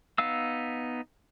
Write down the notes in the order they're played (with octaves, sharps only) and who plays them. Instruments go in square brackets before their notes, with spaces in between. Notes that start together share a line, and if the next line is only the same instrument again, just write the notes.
[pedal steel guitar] B3 D#4 F5 E6